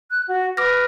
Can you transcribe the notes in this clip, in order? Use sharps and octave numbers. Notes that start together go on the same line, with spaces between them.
F#6
F#4
B4 D6 F6 A#6